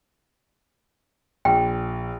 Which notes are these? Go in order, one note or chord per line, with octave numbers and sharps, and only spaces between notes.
A#1 G5